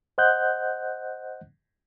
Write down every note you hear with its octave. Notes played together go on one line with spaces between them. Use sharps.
C5 D#5 F#5 F#6 G6